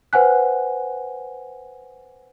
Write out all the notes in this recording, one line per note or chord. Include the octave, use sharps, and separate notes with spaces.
B4 C5 F#5 G#5 F#6